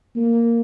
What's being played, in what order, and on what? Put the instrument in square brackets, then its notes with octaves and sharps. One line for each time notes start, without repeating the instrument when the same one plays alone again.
[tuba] A#3